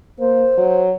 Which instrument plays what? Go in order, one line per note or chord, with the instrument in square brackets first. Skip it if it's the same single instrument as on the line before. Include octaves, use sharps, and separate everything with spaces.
[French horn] A#3 [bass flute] C5
[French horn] F#3